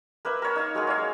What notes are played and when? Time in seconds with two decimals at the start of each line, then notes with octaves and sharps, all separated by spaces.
0.25 A#3 B4 E5
0.42 A#4 C#5 B5
0.56 D#4 F5
0.75 F#3 G#3 A#3 G#4
0.87 C#5 E5 F5
1.00 F#5